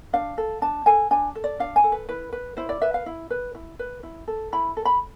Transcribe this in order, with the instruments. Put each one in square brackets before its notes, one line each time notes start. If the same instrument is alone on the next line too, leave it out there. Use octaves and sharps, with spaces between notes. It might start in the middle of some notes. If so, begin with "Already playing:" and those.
[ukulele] D4 F5
A4
D4 A5
A4 G#5
D4 G#5
A4
D5
D4 F5
G#5
A4
B4
E4 B4
B4
E4 C5
D5
B4 E5
F5
E4
B4
E4
B4
E4
A4
E4 B5
A4
B5